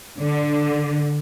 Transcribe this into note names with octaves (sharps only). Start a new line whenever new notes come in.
D3